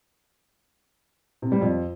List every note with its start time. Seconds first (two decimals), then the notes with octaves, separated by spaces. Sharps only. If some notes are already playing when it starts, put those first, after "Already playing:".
1.42 C3
1.52 G3
1.61 F2